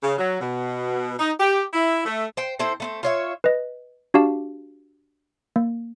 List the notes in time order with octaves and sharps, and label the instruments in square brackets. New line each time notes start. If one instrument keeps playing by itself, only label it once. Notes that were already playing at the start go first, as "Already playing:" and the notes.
[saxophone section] C#3
F#3
B2
D#4
G4
E4
A3
[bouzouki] C5 G5
C4 E4 A4 C5
A3 B3 C4
F4 C#5 E5
[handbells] B4 D#5
D4 F#4 G4 F5 A5
A#3